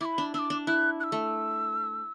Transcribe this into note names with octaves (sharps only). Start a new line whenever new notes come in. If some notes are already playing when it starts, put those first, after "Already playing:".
E4 B5 D6
D4
D4 D6 E6
D4
E4 F#6
F#6
E6
A3